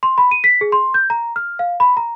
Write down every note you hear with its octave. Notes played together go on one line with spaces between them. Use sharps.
C6
B5
D#7
B6
G#4
C6
G6
A#5
F6
F5
B5
A#5